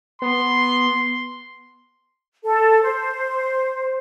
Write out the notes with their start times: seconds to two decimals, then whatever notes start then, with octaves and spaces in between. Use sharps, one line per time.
0.22 B3 C6
2.44 A4
2.84 C5